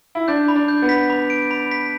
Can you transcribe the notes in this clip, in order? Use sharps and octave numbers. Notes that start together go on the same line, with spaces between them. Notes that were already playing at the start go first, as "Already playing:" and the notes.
E4
D4 G6
B5
D4
G6
B3
B6
B5
D7
B5
B6